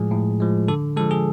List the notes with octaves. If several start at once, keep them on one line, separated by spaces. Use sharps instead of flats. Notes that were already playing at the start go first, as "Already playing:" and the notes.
Already playing: A2 F3 G#3 G#4
A2
F3 G#3
D3 A4
F3 G#3 A4
G#4